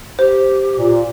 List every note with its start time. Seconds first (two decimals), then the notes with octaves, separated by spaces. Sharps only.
0.19 G4 C5
0.76 A#2